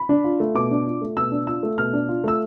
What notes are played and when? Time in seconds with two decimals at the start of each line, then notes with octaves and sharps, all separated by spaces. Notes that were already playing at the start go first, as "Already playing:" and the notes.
Already playing: B5
0.09 D4
0.24 F4
0.40 A3
0.55 B2 D6
0.71 D4
0.87 F4
1.02 A3
1.17 B2 E6
1.32 D4
1.47 F4 E6
1.63 A3
1.78 B2 F6
1.93 D4
2.09 F4
2.24 A3 E6